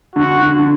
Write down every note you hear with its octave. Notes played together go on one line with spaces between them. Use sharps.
D3 F#4
D3
D3